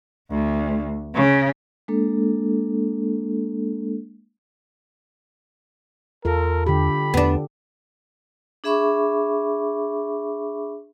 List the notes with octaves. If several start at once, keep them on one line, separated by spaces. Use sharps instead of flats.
D2
C#3
G#3 A#3 D4 A4
E2 F4 A4 A#4
D3 G4 B5
E2 B3 D4
D4 G#4 E5 B5 C#6 D6